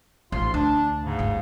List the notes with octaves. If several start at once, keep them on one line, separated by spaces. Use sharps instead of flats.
A1 G#2 F4 C6
D2 D4
G#2 C#3
G1 G3